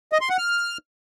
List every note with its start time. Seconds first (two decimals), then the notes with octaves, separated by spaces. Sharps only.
0.13 D#5
0.21 C6
0.29 F#5
0.38 F6